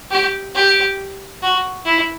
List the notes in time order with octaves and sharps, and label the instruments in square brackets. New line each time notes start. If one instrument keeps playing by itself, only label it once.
[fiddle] G4
G4
F#4
E4